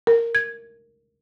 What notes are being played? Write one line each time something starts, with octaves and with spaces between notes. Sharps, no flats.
A#4
G#6